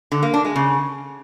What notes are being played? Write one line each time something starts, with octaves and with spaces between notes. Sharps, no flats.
D3
A#3
D4
G#3
C#3